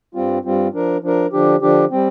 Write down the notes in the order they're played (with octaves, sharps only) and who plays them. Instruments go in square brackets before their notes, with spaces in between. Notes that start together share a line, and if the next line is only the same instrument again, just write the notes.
[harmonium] G2 G3 C4 F4
G2 G3 C4 F4
F3 D4 A#4
F3 D4 A#4
D3 F3 D4 G4
D3 F3 D4 G4
G3 C4